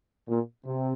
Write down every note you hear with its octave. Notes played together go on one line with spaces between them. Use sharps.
A#2
C3